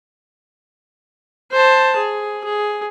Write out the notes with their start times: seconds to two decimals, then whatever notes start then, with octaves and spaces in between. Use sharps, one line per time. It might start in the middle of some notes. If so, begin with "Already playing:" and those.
1.52 C5 A5
1.97 G#4
2.45 G#4